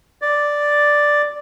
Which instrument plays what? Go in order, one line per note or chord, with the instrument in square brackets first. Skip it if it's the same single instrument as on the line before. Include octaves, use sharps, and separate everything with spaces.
[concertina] D5